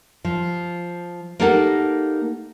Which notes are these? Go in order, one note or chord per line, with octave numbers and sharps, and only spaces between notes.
F3
A#3 D#4 G4 A4 A#4 F#5